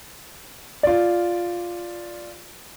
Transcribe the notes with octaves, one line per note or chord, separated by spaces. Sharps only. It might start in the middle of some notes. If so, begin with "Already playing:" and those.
F4 D5